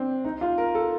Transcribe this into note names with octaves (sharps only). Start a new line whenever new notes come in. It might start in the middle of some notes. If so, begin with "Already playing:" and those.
Already playing: C4 D4
D#4
F4
A#4
A4